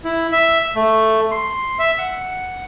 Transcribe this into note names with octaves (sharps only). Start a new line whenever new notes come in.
E4
E5
A3
C6
E5
F#5